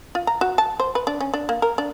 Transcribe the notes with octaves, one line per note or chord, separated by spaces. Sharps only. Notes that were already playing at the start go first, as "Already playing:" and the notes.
F4
A#5
F#4
A5
C5
B4
D4
C#4
D4
A#3
A#4
D4